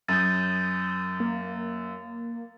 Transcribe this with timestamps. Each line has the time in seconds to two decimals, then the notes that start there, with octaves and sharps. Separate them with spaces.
0.08 F#2 D#6 G6 A6
1.20 A#3